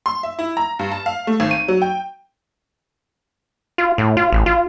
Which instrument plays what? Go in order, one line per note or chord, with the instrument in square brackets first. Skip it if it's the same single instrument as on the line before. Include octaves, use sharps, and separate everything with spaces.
[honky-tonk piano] C6
E5
E4
A#5
G2
A5
F5
A3
G#1
D#7
F#3
G5
[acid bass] F4
A2
F4
A1
F4